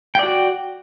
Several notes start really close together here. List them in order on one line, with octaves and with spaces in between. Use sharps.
G5 D5 F#4